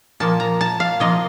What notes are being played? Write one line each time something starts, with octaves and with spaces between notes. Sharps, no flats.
A#2 F3 A#3 A5
A#5
A5
F5
C3 F3 A#3 D#5